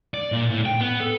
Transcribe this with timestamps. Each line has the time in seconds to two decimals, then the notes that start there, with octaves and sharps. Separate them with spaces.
0.14 D5
0.32 A#2
0.50 A2
0.66 G5
0.81 B3
1.00 A4